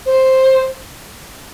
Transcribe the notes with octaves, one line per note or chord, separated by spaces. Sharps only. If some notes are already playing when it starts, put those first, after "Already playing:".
C5